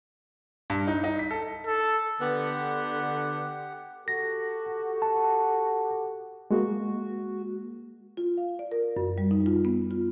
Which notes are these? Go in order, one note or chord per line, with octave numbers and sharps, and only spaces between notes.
G2
D#4
D#4
B6
A4
A4
D3 B3 G4 F#5
F#4 G4 A4 A#6
A5
G#3 A#3 F#4
F4
F5
D5
A#4
F#2
G3
D#4
F4
B3
F4